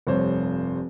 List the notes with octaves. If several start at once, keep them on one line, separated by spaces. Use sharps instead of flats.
F1 G2 C5 C#5